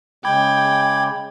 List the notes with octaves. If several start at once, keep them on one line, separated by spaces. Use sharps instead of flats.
C#3 G#3 G5 B5 D6 G#6